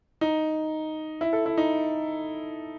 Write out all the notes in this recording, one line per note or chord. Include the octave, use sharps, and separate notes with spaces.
D#4
E4
A4
E4
D#4